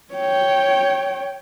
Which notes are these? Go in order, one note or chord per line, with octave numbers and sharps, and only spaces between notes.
C#5 G5